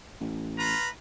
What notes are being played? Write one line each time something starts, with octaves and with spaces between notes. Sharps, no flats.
A1
F4 B4 A#5